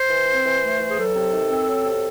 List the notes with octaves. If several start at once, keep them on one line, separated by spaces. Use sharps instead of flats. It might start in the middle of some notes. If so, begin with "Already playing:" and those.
Already playing: C5
E3
C4
E3
A3
E3
G#4
F#3 A4
C3
D#3
C4
F#3
C3